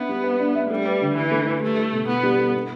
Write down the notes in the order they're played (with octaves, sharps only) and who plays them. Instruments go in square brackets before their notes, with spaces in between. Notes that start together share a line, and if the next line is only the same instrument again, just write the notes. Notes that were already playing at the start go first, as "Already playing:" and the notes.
Already playing: [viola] B3 [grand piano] D4 E5
[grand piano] G3
B4
D4
E5
[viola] G3 [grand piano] A3
[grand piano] B4
D3
[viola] E3 [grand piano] E4
[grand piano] A3
B4
[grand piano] G3 [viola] A3
[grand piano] A4
B2
[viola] B3 [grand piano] E4
[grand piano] G3
A4
B3